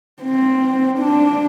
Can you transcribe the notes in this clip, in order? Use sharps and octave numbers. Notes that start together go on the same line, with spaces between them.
C4
D4